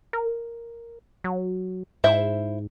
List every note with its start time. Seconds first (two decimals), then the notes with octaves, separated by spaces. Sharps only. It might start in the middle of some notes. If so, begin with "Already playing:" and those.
0.13 A#4
1.24 F#3
2.04 G#2 E4 C5 E5